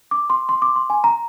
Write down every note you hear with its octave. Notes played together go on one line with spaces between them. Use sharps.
D6
C6
C6
D6
C6
G#5
A#5